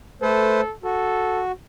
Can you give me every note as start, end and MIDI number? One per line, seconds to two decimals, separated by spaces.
0.22 0.61 57
0.22 0.74 69
0.22 0.61 71
0.22 0.61 72
0.84 1.52 66
0.84 1.43 69